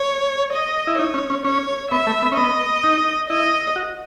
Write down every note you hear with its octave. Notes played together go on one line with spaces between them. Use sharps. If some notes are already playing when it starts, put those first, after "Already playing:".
Already playing: C#5
D#5
E4
D#4 C#5
C#4
C#4
C#4 C#5
B3 E5
A3
B3
C#4
B3 D#5
D#4
E4 D#5
F#4